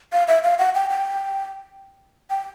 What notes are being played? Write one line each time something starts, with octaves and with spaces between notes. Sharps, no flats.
F5
E5
F5
F#5
G5
G5
G5